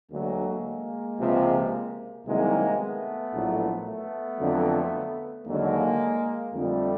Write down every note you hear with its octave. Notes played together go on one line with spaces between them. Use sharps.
D2 D3 F#3 G#3 A#3
C#2 C3 F3
C2 C3 D#3 F#3 G#3 A#3
A3 B3
A#1 A2 F#3
A3 B3
F2 D3 F#3
D#2 D3 F#3 G#3 A#3
F2 D3 F3 G3 A3